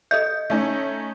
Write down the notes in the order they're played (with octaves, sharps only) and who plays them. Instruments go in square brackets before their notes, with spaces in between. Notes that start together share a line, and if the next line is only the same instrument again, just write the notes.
[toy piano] A4 D#5 E5 [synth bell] G6
[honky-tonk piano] A3 C#4 D#4